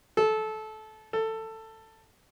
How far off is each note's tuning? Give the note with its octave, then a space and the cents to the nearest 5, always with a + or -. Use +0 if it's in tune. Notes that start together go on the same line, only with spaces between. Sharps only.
A4 -20
A4 +15